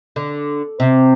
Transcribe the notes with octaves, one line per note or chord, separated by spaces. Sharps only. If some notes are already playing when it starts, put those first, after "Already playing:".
D3
C3